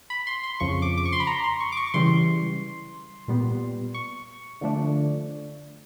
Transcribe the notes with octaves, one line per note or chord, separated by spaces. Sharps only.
B5
C6
C6
F2 C#3 F3 C#6
D6
D6
C#6
C6
B5
A#5
C6
C#6
D6
C#6
C#6
C#3 E3 G3 C6
A#2 G3 B3
C#6
D3 F3 A3 D4